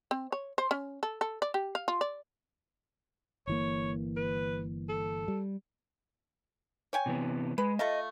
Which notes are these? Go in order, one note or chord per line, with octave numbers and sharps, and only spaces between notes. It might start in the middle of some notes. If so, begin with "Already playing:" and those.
C4
C#5
C5
C#4
A4
A4
D5
G4
F5
F4
D5
G1 E3 A#3 C#5
B4
A4
G3
C#5 G5 G#5
C3 E3 B3
G#3 B4
A3 F4 A4 D#5